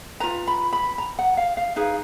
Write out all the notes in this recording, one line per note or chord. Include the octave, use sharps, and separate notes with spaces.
F4 B4 A#5
B5
B5
A#5
F#5
F5
F5
D#4 G#4 B4 F5